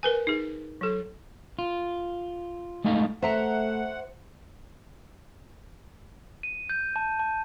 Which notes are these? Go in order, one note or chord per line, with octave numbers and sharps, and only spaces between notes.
A#4 B4 G#5
D#4 G#4
F#3 A4
F4
G#3 A3 D#4 D#5 F5
A3 C5 E5 F#5 A#5 C#6
D#7
G6
A5
A5